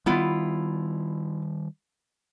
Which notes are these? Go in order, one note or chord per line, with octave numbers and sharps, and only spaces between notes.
D#3 G3 B3 E4 F4